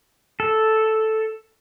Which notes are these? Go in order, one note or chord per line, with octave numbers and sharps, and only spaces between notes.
A4